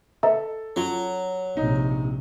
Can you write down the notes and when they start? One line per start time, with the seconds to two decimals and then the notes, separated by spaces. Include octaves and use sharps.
0.23 A4 D#5 E5 A#5
0.76 F#3 C#4 F4
1.57 A#1 C3 D#4